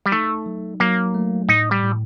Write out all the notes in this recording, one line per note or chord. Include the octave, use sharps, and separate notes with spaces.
G3
A3 D#4
F#3
F#3 A#3
A3
A2 D#4
G3
A2